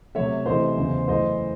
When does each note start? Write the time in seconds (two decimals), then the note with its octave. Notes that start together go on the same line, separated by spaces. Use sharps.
0.15 C3 F#3 A3 C#5 E5
0.46 C3 E3 A3 C5 D#5
0.77 E2 C#3 F#3
1.08 F#2 E3 A3 C5 D#5